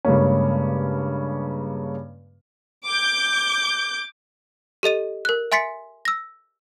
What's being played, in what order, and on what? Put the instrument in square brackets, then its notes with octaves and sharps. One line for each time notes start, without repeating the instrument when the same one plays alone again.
[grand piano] G2 C#3 G#3 A#3 C#4
[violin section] D6 G6
[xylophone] G4 A4 D#5 D#7
A#4 F#6
E5 G#5 C6 A6 B6 C#7
E6 A#6